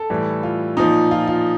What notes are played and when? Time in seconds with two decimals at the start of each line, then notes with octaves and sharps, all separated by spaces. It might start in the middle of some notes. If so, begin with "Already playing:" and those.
Already playing: A4
0.10 A2 E3 G3
0.43 F4
0.77 A#2 F3 D#4
1.11 F4
1.27 F4